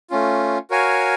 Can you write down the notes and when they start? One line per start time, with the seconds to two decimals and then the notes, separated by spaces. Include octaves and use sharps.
0.10 A3 C#4 F4
0.70 F#4 A#4 C#5 F5 G#5